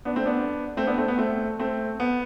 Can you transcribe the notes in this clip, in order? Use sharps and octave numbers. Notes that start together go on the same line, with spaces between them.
B3 D4
A3 C4
B3 D4
A3 C4
B3 D4
A3 C4
B3
A3 C4
A3 C4
B3